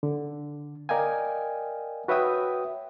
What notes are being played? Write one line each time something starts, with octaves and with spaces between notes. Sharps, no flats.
D3
A#4 D5 D#5 F5 G5 G#5
F#4 B4 C#5 E5 G5 D#6